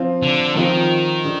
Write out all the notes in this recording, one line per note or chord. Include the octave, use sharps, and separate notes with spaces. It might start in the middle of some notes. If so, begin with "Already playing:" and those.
Already playing: F3 C4 F4
D3
D#3 F3 C4 F4
D3